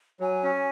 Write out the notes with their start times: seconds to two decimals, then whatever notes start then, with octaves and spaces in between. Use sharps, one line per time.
0.20 F#3 G#5
0.43 C#4